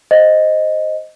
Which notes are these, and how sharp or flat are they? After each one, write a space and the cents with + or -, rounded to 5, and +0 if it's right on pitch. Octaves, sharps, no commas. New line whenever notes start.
C5 +0 D#5 +0